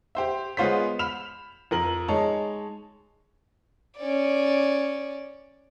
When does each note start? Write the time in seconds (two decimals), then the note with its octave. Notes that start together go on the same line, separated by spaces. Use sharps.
0.15 G4 C5 E5
0.57 G#3 B3 F4 C5 C#5 B6
0.99 B5 F6 E7 F7
1.71 F2 A#4 F#7
2.08 G#3 D#4 C#5 A5
3.98 C#4 D5